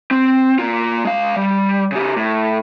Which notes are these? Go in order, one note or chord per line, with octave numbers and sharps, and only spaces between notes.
C4
A#3 F4
G#3 F5
G3
C#3 G4
A2